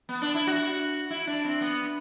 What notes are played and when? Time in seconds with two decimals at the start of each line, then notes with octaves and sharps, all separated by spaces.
0.09 B3
0.22 D4
0.35 E4
0.47 F#4
1.10 E4
1.27 D4
1.45 C4
1.61 B3